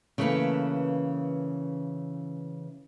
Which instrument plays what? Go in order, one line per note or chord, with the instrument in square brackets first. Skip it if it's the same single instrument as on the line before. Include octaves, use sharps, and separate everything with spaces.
[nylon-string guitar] C#3 E3 A3 A#3 C#4 B4